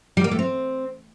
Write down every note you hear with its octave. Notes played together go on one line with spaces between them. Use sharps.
G3
A#3
A3
C4